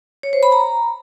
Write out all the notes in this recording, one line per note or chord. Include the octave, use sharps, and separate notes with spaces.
C#5
C5
B5
A#5